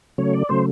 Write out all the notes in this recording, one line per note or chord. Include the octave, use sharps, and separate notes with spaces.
C#3 F#3 A3 C#5
D5
C#3 F#3 A3 C5